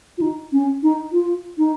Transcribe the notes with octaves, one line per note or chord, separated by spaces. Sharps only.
F4
D#4
C#4
D#4
F4
D#4